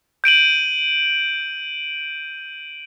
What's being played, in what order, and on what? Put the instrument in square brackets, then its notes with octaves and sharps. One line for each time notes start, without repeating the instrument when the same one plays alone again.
[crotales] G6 D7 D#7 F#7